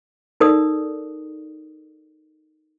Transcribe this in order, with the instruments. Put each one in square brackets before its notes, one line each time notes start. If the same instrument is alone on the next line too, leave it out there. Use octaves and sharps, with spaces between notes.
[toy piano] D#4 A4 A#4 D5 D#6